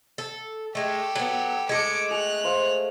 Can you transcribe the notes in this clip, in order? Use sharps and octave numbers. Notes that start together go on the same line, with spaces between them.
A4
G#3 A3 G4 A4
F#3 B3
G#3 A3 D6 C#7
G#4 F#6 F7
C5 F5